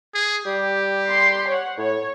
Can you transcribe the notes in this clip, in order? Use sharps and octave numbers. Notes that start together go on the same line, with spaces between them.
G#4
G3 G4
C6 C7
C#5 F#5
A2 C#5